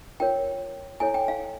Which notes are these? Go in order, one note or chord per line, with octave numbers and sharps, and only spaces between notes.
F4 A#4 C#5 G5
E4 A4 C#5 G#5
G5
F5